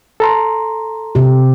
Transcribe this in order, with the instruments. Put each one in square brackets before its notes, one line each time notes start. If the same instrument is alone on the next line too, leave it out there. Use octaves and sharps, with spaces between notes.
[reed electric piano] A4 A#5 C6
[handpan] C3 G4